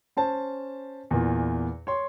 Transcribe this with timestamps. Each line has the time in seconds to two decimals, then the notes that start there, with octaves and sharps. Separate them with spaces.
0.17 C#4 C5 A5
1.11 E2 A#2 E3
1.87 C#5 C6